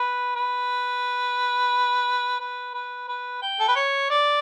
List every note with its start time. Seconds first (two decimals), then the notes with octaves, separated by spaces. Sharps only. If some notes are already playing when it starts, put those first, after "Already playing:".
Already playing: B4
0.36 B4
2.40 B4
2.74 B4
3.08 B4
3.42 G5
3.60 A4
3.68 B4
3.76 C#5
4.10 D5